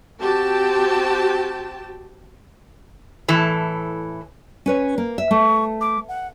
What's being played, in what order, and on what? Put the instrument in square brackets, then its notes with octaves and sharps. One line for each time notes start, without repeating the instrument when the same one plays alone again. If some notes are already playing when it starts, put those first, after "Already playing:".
[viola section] C4 F#4 G4 G5 A5
[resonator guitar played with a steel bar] A2 E3 A4
[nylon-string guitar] C#4 B4 C#5
A#3
E5
[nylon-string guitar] A3 [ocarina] C#6
[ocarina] D6
F#5